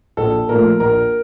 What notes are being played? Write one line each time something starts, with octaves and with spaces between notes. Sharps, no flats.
A#1 A4
A#2 F3 A3 A#4
A#1 A#4